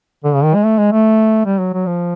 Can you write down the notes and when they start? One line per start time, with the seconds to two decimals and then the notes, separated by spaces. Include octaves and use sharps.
0.24 D3
0.34 C#3
0.44 D#3
0.55 G#3
0.65 A3
0.78 G#3
0.92 A3
1.46 G3
1.59 F#3
1.73 F#3
1.86 F3